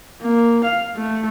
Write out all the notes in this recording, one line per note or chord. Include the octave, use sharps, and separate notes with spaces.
A#3
F5
A3